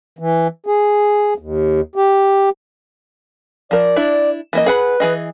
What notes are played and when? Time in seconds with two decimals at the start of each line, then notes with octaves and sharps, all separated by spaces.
0.19 E3
0.66 G#4
1.38 D#2
1.95 G4
3.71 F3 A#4 D5
3.96 D4 E4
4.53 E3 A#3 D#5
4.66 G#4 B4 F#5 B5
5.00 E3 G#4 D#5